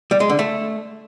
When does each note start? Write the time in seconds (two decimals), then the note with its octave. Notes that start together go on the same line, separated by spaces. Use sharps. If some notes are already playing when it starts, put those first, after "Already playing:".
0.11 G3
0.20 G#3
0.30 D3
0.39 A3